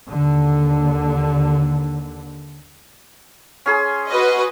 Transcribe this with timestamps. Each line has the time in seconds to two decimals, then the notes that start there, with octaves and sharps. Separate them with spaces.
0.11 D#2 D3
3.66 C#4 G#4 C6
4.09 F#4 B4 D#5